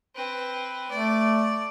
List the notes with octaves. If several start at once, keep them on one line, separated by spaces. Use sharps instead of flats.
C4 B4
A3 D5